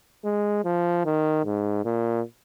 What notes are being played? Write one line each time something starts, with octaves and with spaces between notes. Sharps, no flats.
G#3
F3
D#3
G#2
A#2